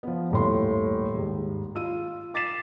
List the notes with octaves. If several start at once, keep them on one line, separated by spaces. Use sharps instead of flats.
F3 B3
D#1 A2 C6
D#2 G#2
F4 E6 D#7
D6 A6 B6 C7 E7